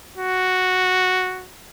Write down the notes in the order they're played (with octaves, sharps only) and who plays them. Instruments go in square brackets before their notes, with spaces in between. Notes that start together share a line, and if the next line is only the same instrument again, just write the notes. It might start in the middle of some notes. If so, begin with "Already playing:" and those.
[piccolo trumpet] F#4